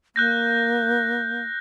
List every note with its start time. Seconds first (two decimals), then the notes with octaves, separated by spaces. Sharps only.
0.16 A#3 F#6 G6 A#6